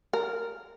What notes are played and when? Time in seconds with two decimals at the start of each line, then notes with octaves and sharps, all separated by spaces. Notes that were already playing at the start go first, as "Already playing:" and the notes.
0.13 A#4